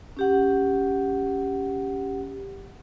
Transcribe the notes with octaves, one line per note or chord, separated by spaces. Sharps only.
C#4 G4 F#5